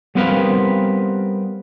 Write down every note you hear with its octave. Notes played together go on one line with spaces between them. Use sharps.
G3 B3 C4 A#4 B4 F5